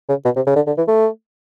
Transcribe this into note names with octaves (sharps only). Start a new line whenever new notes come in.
C#3
B2
C3
C#3
D3
D3
E3
A3